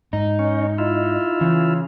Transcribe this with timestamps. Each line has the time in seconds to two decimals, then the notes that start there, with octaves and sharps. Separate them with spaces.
0.13 G#2 D#4
0.39 C#4
0.78 E4 F4
1.41 C#3 E3